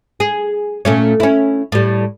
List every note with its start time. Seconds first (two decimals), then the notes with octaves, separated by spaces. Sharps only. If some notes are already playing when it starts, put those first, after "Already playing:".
0.20 G#4
0.85 A#2 A3 C#4
1.20 C#4 E4
1.72 A2 G3